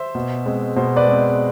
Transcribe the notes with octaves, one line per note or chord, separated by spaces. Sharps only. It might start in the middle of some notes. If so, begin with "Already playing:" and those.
Already playing: C5 E5
B2
G#3 C4
B2 C5
B4 D5
G#3 C4